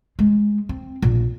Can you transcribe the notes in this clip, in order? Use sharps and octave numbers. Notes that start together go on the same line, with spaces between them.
G#3
C4
A#1